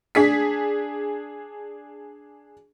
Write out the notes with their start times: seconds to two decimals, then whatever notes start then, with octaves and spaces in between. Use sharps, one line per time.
0.15 D4 G#4 B6